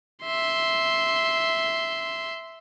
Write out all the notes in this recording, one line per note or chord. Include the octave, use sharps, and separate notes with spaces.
E5 C6